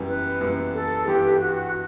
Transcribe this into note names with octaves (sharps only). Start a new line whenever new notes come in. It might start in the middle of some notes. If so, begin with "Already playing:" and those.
Already playing: F#2 E3 G3 B3
B4
F#2 E3 G3 B3
A4
G2 E3 B3 G4
F#4